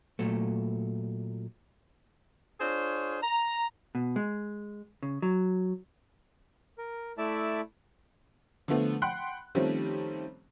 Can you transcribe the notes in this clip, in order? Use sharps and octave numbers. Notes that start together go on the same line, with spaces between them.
A#2 F#3 A3
D4 F4 G#4 C5 C#5
A#5
B2
G#3
C#3
F#3
A#4
A3 E4 D5 E5 A5
D3 F3 A3 B3
F#5 G5 B5 C6 F#6
D#3 F3 G3 A3 C4 C#4